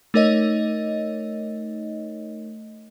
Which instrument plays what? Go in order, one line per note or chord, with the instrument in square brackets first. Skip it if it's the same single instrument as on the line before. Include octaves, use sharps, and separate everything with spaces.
[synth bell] A3 D#4 A#4 C#5 D#5